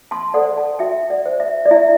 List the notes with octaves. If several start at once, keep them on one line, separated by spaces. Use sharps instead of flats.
A5 C6
A4 C5 D5 F#5
F#5 A5
F#4 E5 G5
D5 F#5
C5
E5
D5
E4 E5